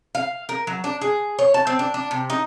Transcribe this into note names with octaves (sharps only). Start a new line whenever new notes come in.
F5
A#4
F#3
D4
G#4
C#5
A5
C4
D4
D4
C3
D#4